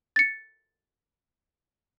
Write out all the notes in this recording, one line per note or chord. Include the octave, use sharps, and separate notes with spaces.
A6 C#7